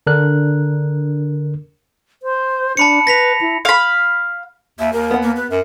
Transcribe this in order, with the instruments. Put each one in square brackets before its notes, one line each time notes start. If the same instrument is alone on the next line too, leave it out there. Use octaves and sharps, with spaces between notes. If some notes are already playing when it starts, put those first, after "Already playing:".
[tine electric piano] D3 D4 A#4 F#6
[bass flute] C5
[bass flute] D4 [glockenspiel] A5 B5 C#7
[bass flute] B4 [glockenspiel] A#6 B6 F7
[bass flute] E4
[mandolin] F5 B5
[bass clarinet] D#2 [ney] E5
[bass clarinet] D#2 [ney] A#4
[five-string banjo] B3 F#5
[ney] A#3
B4
[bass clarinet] F#2 [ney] A#4